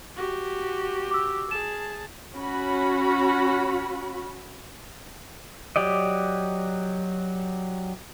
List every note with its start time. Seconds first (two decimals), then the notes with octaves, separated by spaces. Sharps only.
0.16 F#4 G4
1.11 D6 E6
1.51 G#4 A5 E7
2.34 C#4 F#4 B5
5.76 F#3 G4 D5 D#5